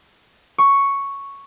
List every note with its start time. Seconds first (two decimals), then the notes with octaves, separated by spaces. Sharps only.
0.58 C#6